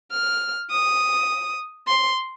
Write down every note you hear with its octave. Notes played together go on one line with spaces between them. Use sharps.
F6
D#6
C6